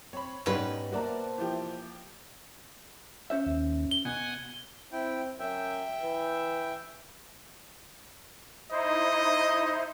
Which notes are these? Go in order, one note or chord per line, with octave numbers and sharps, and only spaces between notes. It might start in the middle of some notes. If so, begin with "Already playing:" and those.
C4 C#5 B5
G#2 B2 G3 C#4 D#4 B4
A#3 F#4 C5 D5 E5 A5 A#5
E3 F3 G4
C#4 C5 E5
D#2
G7
B2 F#5 G#5
C4 E4 G5
F#2 E5 G5
E3
D#4 E4 C5 D#5